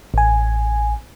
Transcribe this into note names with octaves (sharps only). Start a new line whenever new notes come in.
A1 G#5